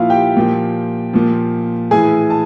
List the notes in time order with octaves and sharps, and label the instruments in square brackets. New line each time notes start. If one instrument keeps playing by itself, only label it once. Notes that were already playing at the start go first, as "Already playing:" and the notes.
Already playing: [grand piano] A#2 F3 E4 F4 E5 F5
G4 G5
A#2 F3
A#2 F3
A2 E3 G#4 G#5
A5